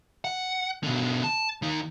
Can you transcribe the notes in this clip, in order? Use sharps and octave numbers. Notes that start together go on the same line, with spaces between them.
F#5
B2 D3
A5
D#2 D#4